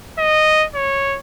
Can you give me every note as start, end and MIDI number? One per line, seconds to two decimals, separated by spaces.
0.18 0.65 75
0.74 1.17 73